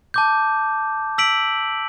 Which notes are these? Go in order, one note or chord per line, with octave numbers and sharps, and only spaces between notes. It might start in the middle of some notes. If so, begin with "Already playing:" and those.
A5 D6 G6
E6 B6 D7 F#7